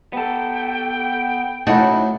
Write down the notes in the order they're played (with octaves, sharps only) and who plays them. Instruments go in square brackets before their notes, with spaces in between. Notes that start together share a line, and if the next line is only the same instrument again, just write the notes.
[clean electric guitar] B3 A4 [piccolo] G5
[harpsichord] A2 F#3 A5 [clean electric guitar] C#3 E4 B5 [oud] D#4 F#4